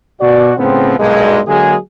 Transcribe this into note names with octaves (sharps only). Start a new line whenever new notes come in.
B2 F#4 D5
A2 C#3 F3 B3 C4
B1 G2 A#2 G#3
D3 F#3 G#3 A#3 G#4